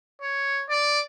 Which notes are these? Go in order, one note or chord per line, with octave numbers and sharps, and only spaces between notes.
C#5
D5